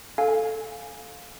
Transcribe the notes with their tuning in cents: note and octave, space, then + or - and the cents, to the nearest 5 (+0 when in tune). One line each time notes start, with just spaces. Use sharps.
A4 +0 F5 +15 G#5 +0